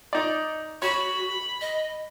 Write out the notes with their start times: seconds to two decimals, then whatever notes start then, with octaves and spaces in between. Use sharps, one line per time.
0.13 D#4 D5
0.82 F#4 C#5 B5
1.61 D#5